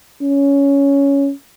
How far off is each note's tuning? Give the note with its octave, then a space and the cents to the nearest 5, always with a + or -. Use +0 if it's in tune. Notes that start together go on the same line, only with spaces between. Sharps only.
C#4 +10